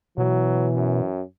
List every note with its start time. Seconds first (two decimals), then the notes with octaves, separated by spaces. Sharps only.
0.18 B2 E3 F#3
0.75 F#2